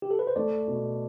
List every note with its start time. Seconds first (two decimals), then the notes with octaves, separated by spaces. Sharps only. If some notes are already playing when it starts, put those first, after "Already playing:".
0.02 G4
0.11 A4
0.19 B4
0.27 C5
0.36 A3 D5
0.68 B2